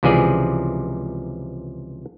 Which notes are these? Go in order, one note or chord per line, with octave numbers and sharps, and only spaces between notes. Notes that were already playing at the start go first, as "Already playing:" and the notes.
C#2 C3 E3 F3 G#4 D5